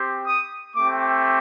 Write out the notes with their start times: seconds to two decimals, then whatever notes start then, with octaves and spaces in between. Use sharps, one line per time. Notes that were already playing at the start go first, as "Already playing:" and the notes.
Already playing: C4 G4
0.26 D#6
0.76 A3 C4 G4 D6